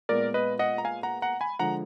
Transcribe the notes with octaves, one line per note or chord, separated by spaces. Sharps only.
A#2 G#3 B3 A#4 D5
B4 D#5
D#5 F#5
A#5
F5 G#5
F#5 A#5
F#5 A#5
G#5 B5
D3 F3 G#3 F#5 A#5